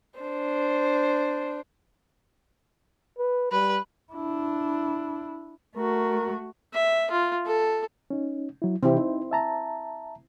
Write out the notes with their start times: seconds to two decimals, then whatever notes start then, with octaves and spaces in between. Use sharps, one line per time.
0.20 D4 C5
3.18 B4
3.52 G3 B4
4.12 D4 E4
5.77 A3 F#4 A#4
6.73 E5
7.11 F4
7.46 A4
8.10 C#4 D#4
8.62 F#3 E4
8.83 C3 E3 C4 E4 G4
8.96 D#4
9.31 E5 A5 A#5